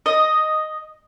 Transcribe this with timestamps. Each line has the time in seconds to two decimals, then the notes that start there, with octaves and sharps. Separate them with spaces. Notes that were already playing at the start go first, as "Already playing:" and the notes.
0.06 D#5